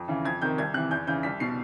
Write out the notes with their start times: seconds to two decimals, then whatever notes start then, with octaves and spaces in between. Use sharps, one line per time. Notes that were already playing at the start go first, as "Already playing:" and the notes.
Already playing: F2
0.08 C#3 E3
0.25 F2 G#6
0.42 C3 D#3 G6
0.58 C2 G#6
0.74 C3 E3 F#6
0.91 E2 G6
1.07 C#3 E3 G6
1.23 C2 B6
1.40 B2 C7